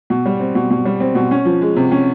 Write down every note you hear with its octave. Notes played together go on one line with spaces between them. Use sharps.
B2
G3
C4
B2
B2
G3
C4
B2
C#4
F3
G#3
C3
C#4